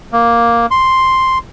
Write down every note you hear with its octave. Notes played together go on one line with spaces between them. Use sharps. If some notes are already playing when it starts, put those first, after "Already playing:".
A#3
C6